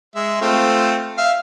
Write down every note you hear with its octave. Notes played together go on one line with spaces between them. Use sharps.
G#3 E5
A3 C4 F4
E5 F5